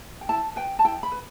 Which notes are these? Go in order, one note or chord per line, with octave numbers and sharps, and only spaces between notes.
G5
E4 A5
B4 G5
A5
E4 G5
B5
B4